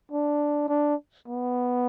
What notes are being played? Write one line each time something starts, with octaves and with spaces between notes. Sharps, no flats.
D4
D4
B3